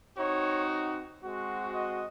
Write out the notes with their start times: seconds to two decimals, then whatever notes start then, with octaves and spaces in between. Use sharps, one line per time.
0.17 C4 D#4 F#4 C#5
1.22 G#3 C4 F#4
1.74 D#5